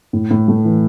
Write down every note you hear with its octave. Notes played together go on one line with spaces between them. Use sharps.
A2
A2
A3
E3